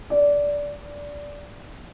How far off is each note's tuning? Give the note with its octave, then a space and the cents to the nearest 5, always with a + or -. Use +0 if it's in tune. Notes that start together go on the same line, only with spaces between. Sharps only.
D5 -15